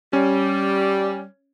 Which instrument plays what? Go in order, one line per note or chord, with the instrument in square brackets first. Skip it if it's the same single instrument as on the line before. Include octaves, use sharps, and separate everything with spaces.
[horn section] G3 [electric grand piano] C#4